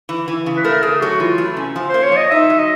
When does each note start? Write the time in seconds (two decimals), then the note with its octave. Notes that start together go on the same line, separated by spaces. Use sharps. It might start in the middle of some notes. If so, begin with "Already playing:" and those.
0.09 E3
0.28 E3
0.46 C#3
0.57 B4
0.64 A3 A#4
0.83 A3 G#4
1.01 F#3 F#4
1.20 E3 F4
1.38 A3
1.56 C3 C#4
1.76 F3
1.89 C5
1.94 A#3
2.03 C#5
2.12 F3
2.17 D#5
2.31 D#4 E5
2.50 F#3
2.59 D#5